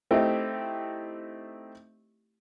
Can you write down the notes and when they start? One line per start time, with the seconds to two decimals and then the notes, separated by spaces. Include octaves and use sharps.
0.11 A3 C4 D#4 E4 G4